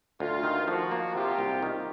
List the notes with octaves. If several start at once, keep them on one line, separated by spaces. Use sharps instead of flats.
D2 F4
D#3
F3 F#4
A#3
C3 F4 G4
C2
D#3